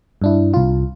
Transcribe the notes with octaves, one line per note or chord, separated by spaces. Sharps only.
G2 D4 E4
C2 F4